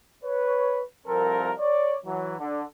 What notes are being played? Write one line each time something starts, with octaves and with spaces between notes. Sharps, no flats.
B4 C#5
C2 F3 C4 A4 A#4
C#5 D5
E3 F#3
D3